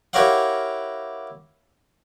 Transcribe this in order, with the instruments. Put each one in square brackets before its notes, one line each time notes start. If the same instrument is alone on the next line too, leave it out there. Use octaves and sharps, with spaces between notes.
[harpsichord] E4 G4 A#4 C#5 F5 F#5